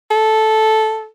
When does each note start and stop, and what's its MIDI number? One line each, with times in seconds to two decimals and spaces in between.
0.11 1.06 69